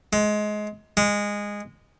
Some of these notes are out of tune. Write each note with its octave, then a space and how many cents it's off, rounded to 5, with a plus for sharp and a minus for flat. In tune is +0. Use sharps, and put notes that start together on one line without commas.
G#3 +20
G#3 -15